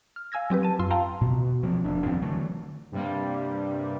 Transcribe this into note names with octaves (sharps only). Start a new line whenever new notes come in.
F6
F5 G#5 E6 G#6 A#6
F#3 C4 G4 B4
A5 D#7
F#2 F4 C6 E6
F5 G5 A5 A#5 C6
B2
D2 F3 A#3 C4
F1 D4
D#2 F3 C4
D3 E3 F#3 A3
G2 C3 G3 A#3